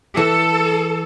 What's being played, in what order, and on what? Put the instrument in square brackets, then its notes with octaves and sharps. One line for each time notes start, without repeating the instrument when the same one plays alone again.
[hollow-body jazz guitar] E3 [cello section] A4